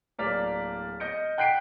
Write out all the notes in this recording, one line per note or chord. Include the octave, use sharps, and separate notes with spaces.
D1 A#3 D5 F6 B6
D#5 G6 C#7 D7
F#5 G5 F#6 B6 C7 D7